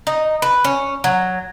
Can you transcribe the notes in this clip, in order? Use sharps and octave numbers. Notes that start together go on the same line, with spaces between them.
D#4
B4
C#4
F#3